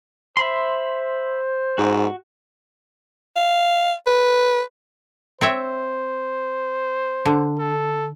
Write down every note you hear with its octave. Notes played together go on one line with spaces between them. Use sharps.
C5 E5 B5 C6
G#2 F#4
F5
B4
C4 C5 C#5 E5
D3
A4